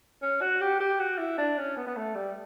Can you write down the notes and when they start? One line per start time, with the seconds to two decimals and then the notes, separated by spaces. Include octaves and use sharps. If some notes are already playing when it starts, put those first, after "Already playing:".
0.23 C#4
0.42 F#4
0.61 G4
0.80 G4
1.00 F#4
1.18 E4
1.38 D4
1.58 C#4
1.77 B3
1.87 B3
1.97 A3
2.15 G3